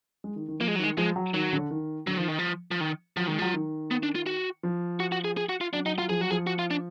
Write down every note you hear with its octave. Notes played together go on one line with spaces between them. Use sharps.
G#3
D#3
D#3
F3 A#3
G#3
F#3
D#3 G#3
F3 G#3
F#3
D#3 F#3
D3
D#3
D3 F#3
D#3 F3
D#3
F3
F3
D#3
F3 F#3
D#3 G#3
F3 F#3
D#3
B3
D4
F4
F#4
F3
F#4
F#4
G#4
G#4
F#4
F4
F#3 D4
F#3 D#4
F#3 F4
F3 G#4
F#3 F#4
F3 G#4
F#4
F4
D4